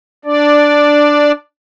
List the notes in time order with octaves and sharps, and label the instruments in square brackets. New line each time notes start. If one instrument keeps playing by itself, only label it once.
[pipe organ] D4 D5